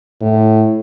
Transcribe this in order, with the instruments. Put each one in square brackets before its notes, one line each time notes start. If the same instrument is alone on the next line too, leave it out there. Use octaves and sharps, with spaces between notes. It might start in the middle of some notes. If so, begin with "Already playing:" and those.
[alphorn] A2